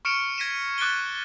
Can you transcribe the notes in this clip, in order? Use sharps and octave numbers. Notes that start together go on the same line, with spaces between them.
C#6 F6 C#7 D7 E7 F7
G#6 A#6 B6 D#7 E7
D6 F#6 A6 B6 D7 G7